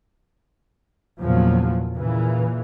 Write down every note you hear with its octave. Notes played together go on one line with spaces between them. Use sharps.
E2 A#2 C#3 F3 F#3
A#2 C#3 E3